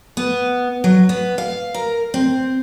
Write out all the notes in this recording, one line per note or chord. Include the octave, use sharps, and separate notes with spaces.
B3
F#3
B3
F5
A#4
C4